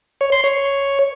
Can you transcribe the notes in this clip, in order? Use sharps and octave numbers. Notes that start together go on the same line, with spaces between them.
C#5
C6
C#5